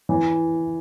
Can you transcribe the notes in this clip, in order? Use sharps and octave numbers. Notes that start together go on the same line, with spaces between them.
E3